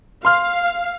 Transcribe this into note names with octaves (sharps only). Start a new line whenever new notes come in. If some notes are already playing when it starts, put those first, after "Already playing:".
F5 C6 F6